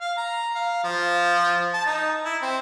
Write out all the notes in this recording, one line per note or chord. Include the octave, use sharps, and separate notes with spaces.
F5
A#5
F5
F3
A5
D#4
E4
C4